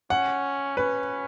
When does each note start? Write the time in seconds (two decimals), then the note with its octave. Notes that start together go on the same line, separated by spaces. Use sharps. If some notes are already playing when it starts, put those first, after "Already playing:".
0.10 C#4 F#5
0.77 C#4 B4